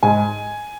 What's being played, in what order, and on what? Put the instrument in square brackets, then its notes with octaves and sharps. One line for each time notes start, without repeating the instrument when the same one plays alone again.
[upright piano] G#2 G#5